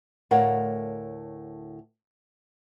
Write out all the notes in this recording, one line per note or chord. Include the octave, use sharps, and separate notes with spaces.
D2 A2 A#4 C#5 F5 F#5